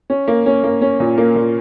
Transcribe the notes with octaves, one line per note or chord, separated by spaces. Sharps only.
C#4
A#3
C#4
A#3
C#4
A#2
A#3
A#2